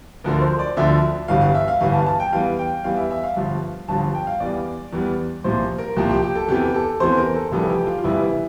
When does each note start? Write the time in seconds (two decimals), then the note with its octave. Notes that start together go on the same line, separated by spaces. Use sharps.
0.24 D2 D3 F3 A#4
0.42 C5
0.59 D5
0.77 D2 D3 F3 E5
1.28 G1 G2 E3 F5
1.41 F5
1.54 E5
1.68 F5
1.80 G1 G2 E3 F5
1.93 A5
2.06 A5
2.20 G5
2.33 E2 E3 G3 F5
2.59 G5
2.84 E2 E3 G3 F5
2.97 E5
3.11 E5
3.24 F5
3.36 G1 G2 F3
3.88 G1 G2 F3 A5
4.15 G5
4.27 F5
4.40 E2 E3 G3 D5
4.93 E2 E3 G3
5.44 C2 A#2 F3 C5
5.78 A#4
5.96 C2 A#2 F3 G4
6.09 G4
6.22 G4
6.35 A4
6.48 E2 C3 E3 G4
6.74 A4
7.00 E2 C3 E3 C5
7.17 A#4
7.34 A4
7.52 F1 F2 E3 G3 A4
7.70 G4
7.87 F4
7.99 F4
8.04 F1 F2 E3 G3 E4